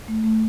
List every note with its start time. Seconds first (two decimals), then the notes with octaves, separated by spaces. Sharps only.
0.08 A3
0.24 A3